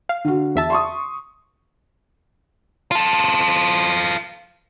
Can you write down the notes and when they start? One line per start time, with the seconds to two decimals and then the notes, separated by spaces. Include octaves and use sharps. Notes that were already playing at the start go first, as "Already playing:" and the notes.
0.09 F5
0.25 D3 F#4
0.55 E2 E5 A5
0.70 C6 C#6 D#6
2.91 F4 A4